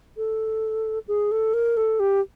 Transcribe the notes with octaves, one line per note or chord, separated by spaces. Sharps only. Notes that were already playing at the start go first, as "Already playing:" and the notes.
A4
G#4
A4
A#4
A4
G4